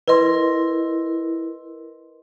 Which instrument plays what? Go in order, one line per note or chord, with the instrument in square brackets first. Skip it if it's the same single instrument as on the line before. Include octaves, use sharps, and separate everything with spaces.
[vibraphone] E4 A#4 [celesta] B4 D#5 C6